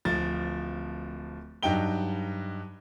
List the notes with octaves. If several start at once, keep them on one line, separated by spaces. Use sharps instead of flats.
D1 F3 A6
G2 F#3 D#4 G5 G7